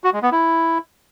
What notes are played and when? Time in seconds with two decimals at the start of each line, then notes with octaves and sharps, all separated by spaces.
0.04 F#4
0.13 G#3
0.23 B3
0.32 E4